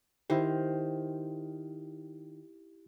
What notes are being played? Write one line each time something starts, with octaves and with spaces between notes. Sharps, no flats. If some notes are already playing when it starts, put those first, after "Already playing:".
D#3 E4 G4 C5